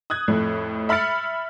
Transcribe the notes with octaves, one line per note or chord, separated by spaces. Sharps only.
D#6 F#6 G#6
F2 A2
E5 B5 F6 A6 C#7